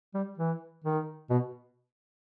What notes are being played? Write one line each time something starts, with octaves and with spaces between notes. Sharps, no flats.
G3
E3
D#3
B2